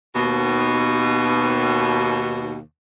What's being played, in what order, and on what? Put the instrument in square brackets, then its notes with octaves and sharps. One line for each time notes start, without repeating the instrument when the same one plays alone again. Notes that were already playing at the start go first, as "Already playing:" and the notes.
[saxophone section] D#2 B2